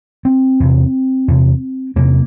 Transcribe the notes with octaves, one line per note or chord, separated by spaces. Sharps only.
C4
E2 C3
E2 C3
E2 C3 A#3